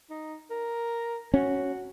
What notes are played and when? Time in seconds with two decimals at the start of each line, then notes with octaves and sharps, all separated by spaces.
0.10 D#4
0.50 A#4
1.34 C#4 F#4